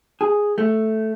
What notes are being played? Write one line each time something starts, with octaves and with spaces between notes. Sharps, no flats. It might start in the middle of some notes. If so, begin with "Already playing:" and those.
G#4
A3